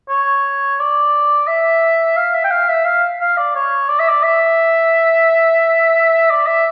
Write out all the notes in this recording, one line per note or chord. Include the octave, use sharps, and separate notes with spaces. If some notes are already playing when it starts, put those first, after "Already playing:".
C#5
D5
E5
F5
E5
G5
F5
E5
F5
F5
D5
C#5
D5
E5
D5
E5
D5
E5